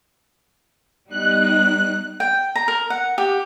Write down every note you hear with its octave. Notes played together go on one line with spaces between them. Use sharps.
G3 B3 D#4 F#6
G5
A#5
A#4
F#5
G4